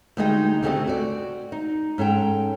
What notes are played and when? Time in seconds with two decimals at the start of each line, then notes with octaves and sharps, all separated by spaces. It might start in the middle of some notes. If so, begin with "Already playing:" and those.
0.17 D2 G3 G#3 D#4 D#5 G5
0.63 D2 C#3 A3 C4 G4 D#5
0.87 F#4 D5
1.52 D#4
1.98 G#2 C#4 A4 G5